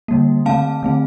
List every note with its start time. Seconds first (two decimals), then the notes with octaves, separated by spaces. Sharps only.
0.08 D3 G3 A#3
0.46 D3 A3 C4 F5 A5
0.83 D3 A3 C4